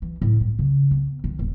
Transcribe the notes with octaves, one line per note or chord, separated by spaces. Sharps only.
E3
A2
G2
C#3
B3
D#3
D#1